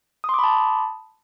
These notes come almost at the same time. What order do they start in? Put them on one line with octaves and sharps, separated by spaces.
D#6 C6 D6 B5 A5